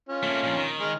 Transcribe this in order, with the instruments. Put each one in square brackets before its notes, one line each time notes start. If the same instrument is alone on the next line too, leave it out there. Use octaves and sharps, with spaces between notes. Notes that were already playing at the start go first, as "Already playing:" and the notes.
[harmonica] C#4 F4
[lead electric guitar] A3 A#3
A#2 F3
D#3
[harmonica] G#3 F6